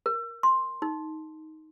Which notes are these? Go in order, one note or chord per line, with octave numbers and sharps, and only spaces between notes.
A#4
C6
D#4